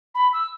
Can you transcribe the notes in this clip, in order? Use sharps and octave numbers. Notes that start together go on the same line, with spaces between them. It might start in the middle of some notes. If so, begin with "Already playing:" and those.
B5
E6